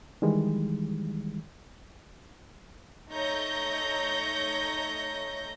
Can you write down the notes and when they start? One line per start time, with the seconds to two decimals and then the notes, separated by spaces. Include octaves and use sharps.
0.22 D#3 E3 G3 G#3
3.11 A3 D#4 C#5 G6 A#6